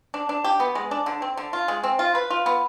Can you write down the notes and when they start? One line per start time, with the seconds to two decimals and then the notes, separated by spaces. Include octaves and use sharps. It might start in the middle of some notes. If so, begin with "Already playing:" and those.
0.14 D4
0.29 D4
0.44 G4
0.60 B3
0.75 G#3
0.91 D4
1.06 D3
1.22 C4
1.37 D3
1.53 F4
1.68 G#3
1.83 C4
1.99 F4
2.15 B4
2.30 F4
2.46 B3